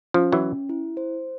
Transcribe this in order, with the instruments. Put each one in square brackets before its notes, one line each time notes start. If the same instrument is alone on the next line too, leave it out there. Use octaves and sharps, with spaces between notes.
[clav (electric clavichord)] F3 [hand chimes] C#4
[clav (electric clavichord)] E3 F#3
[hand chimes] C#4
E4
C5